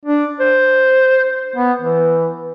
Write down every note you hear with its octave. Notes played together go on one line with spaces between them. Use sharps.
D4
C5
B3
E3